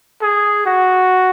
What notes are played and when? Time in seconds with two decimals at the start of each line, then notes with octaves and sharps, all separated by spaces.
0.22 G#4
0.66 F#4